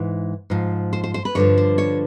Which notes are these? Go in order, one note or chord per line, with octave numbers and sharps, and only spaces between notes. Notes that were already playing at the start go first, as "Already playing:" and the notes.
Already playing: G#2 E3
G#2 F3
C5
C5
C5
B4
G2 D3 F3 C#5
C5
C#5